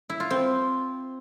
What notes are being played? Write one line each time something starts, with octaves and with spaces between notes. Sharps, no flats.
E4
F4
C4